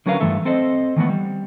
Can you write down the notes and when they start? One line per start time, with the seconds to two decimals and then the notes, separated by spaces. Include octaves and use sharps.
0.06 D3 F#3 C#4 A#4 B4 F5
0.20 G2 A#2 E3 A3 A4 E5
0.45 C4 A4 C5 D#5
0.96 D#3 E3 A3 B3
1.09 G3